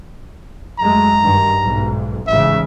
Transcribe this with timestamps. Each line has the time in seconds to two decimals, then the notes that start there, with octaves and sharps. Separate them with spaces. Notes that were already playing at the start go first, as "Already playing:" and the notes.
0.79 F#2 G#3 A3 A#5
1.21 G2 D#3
1.62 B1 G#2
2.27 A1 G#2 C#3 E5